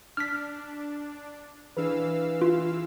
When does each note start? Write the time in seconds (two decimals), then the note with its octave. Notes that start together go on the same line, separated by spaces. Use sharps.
0.17 D4 F6 B6
1.77 E3 D4 G#4 B4 F5 E6
2.42 F4